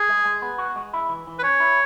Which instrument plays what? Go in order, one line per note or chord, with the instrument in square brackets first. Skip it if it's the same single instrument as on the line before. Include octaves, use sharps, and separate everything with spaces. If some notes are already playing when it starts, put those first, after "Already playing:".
Already playing: [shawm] G#4
[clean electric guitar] G#3
G#3
B3
F#4
G#3
E4
E3
E3
[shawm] B4
[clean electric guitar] C#4 [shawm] C#5
[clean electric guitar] E4